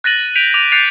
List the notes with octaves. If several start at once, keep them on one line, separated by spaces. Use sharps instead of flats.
F#6 A6 A#6 D#7 F#7
G6 B6 D7 D#7 F7
D6 F7
F#6 G6 A6 C7 C#7 F7